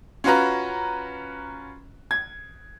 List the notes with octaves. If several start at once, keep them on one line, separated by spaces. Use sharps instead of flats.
C#4 F4 F#4 B4 A#5
G#6